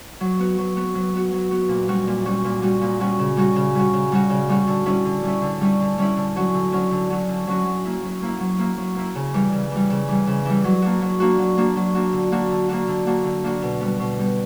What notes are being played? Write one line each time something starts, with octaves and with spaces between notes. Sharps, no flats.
F#3
B3 F#4
F#3
B3 F#4
F#3
B3 F#4
F#3
B3 F#4
A#2
G3 C#4 F#4
A#2
G3 C#4 F#4
A#2
G3 C#4 F#4
A#2
G3 C#4 F#4
C#3
G3 C#4 F#4
C#3
G3 C#4 F#4
C#3
G3 C#4 F#4
C#3
G3 C#4 F#4
D3
G3 C#4 E4
D3
G3 C#4 E4
D3
G3 C#4 E4
D3
G3 C#4 E4
D3
F#3 C#4 F#4
D3
F#3 C#4 F#4
D3
F#3 C#4 F#4
D3
F#3 C#4 F#4
F#3
A#3 E4
F#3
A#3 E4
F#3
A#3 E4
F#3
A#3 E4
C#3
E3 G3
C#3
E3 G3
C#3
E3 G3
C#3
E3 G3
F#3
A#3 D4 F#4
F#3
A#3 D4 F#4
F#3
A#3 D4 F#4
F#3
A#3 D4 F#4
D3
A#3 D4 F#4
D3
A#3 D4 F#4
D3
A#3 D4 F#4
D3
A#3 D4 F#4
B2
G3 B3
B2
G3 B3